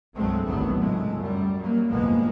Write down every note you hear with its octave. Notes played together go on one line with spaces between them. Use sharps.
C2 G2 F#3 G#3 A3 C4
G#1 D2 A2 F#3 A3 B3
C#2 G#3 A3
F#2 G3
F#3 A#3
G1 C2 F2 G#3 A#3 B3